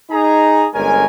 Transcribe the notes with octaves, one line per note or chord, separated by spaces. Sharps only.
D#4 G#4 A#5
G1 G#3 C#4 A#4 G#5